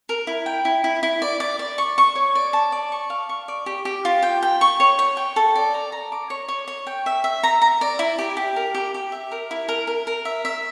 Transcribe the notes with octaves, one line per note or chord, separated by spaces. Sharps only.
A#4
E4
G5
E4
E4
E4
D5
D5
D5
C#6
C#6
C#5
D5
A5
D5
C#6
F5
C#6
D5
G4
G4
F4
G5
G5
C#6
C#5
C#5
G5
A4
D5
A#5
A#5
D6
C#5
C#5
C#5
G5
E5
E5
A#5
A#5
D5
E4
G4
G4
A#4
G4
G4
E5
A#4
E4
A#4
A#4
A#4
E5
E5